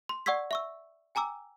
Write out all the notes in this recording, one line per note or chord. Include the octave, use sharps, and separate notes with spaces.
C6
D5 F#5 C#6 E6 G#6 B6
E5 C#6 E6
G5 G#5 A#5 D6 E6